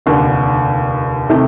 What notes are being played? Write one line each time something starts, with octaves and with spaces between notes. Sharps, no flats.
F1 D#2 D3
C3 D#3 A3